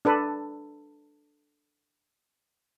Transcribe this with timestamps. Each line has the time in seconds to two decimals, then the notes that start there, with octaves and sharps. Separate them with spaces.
0.05 D4 A4 B4